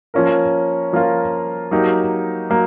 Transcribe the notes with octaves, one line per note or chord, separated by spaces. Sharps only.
F3 A#3 C#4 F4 A#4
F3 A#3 C#4 F4 A#4
F#3 A#3 D#4 G4 A#4
F#3 A#3